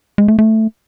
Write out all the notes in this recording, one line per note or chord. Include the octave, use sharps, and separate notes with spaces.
G#3
A3
A3